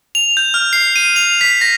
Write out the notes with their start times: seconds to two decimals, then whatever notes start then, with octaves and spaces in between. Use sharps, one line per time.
0.15 F7
0.37 G6
0.54 F6
0.73 C7
0.96 D#7
1.16 F7
1.41 B6
1.61 A#6